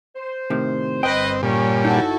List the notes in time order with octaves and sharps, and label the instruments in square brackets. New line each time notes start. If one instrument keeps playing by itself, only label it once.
[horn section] C5
[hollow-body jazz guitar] A2 C3 D#3
[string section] G1 [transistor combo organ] C4 [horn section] B4 D#5 [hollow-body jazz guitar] G5
[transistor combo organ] A#2 G3 [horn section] C#4
[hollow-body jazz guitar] D#4 [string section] E4 F#4 A4